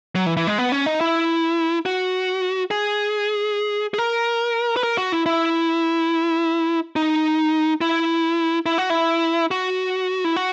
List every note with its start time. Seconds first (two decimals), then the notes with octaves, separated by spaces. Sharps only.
0.15 F#3
0.26 E3
0.37 E3
0.47 G#3
0.58 B3
0.72 C#4
0.86 D#4
1.01 E4
1.86 F#4
2.71 G#4
3.94 G#4
3.98 A#4
4.76 B4
4.83 A#4
4.98 F#4
5.12 E4
5.26 E4
6.96 D#4
7.81 E4
8.66 E4
8.78 F#4
8.90 E4
9.51 F#4
10.25 E4
10.37 F#4